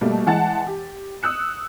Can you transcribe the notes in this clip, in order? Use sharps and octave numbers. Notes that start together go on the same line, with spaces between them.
B2 G3 A3 A#3
E3 G#3 F#5 A5 A6
G4
D#6 E6 F#6 C#7